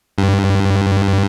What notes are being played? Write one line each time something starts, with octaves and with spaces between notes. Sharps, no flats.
G2